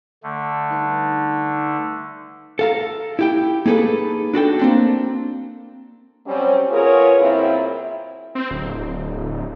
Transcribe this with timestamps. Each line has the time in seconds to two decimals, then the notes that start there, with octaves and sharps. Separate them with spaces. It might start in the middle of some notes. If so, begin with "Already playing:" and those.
0.23 D3 A3
0.68 G3 D#4 B4
2.59 A4 F5 A#5
3.19 E4 G4 G5
3.66 A#3 D#4 G#4 A4 B4
4.34 D4 F#4 A4 G5
4.59 A#3 C4 D4
6.25 F#3 G3 C4 C#4
6.69 B3 F4 G#4 A#4 C#5
7.18 F#2 A#2 C4 E4
8.35 C4
8.51 D1